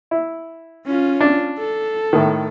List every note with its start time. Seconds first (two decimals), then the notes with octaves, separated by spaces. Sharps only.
0.11 E4
0.86 C#4 F4
1.21 D4
1.58 A4
2.13 A2 D#3